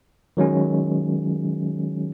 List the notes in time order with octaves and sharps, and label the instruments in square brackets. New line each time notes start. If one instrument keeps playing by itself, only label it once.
[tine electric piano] D#3 F#3 G#3 C#4